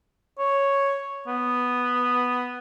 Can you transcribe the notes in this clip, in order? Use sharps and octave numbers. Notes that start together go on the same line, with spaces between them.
C#5
B3